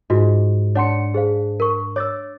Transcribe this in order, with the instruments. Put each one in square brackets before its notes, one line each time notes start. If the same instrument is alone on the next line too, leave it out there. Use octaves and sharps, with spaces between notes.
[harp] G#2 [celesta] F4 F#4
[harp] D4 C#7 [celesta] C#5 F#5 C6
[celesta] G#4 C5 F5
A#4 C#6
[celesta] C#5 E6 [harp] D6 A6